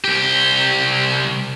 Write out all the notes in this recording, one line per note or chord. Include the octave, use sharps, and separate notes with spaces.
C2 G4